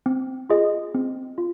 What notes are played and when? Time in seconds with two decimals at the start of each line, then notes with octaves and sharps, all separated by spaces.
0.06 C4
0.50 F4 G#4 D#5
0.94 C4
1.38 F4